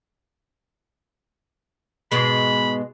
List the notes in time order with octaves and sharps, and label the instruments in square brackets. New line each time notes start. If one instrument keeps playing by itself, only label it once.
[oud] G#2 B2 G#3 [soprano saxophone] B5